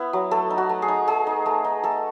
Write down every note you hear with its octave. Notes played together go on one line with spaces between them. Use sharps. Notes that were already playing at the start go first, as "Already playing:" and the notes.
Already playing: B3 E4
F#3
A3 A4
D#4
F#4
A3
G#4
D#4
A3 G#4
D#4
A3
D#4
A3 A4